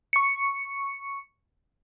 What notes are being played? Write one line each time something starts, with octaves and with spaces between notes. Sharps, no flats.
C#6 C#7